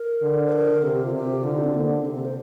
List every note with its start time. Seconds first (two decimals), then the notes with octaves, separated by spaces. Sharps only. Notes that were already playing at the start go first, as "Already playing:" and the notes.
Already playing: A#4
0.22 D3
0.46 C5
0.52 A#4
0.82 C3 A4
0.93 G4
1.04 F4
1.13 C3 G4
1.43 D3 F4
1.54 D#4
1.64 C4
1.74 D3 A#3
1.90 C4
2.05 C3 A4
2.15 A4
2.25 C5